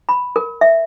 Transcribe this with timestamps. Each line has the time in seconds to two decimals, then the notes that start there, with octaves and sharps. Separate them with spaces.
0.09 B5
0.36 A#4
0.61 E5